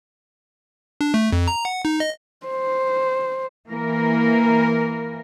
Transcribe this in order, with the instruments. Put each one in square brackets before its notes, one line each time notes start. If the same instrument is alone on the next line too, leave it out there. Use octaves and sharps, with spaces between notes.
[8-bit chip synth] D4
A3
F2
A#5
F#5
D#4
D#5
[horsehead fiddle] C5
[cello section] E3 A#3 A#4